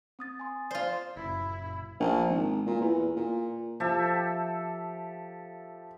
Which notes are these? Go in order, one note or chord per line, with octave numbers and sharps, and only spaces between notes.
C4 D#6 A6
G#5 C6
F4 C5 D5 C6
F#1 F#2 A#2 E4
A#1
G#1
A#2
E2
A#2
F3 G4 A4 E5